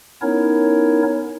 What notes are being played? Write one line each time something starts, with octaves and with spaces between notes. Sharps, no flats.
B3 C#4 D#4 E4 A#4 C#5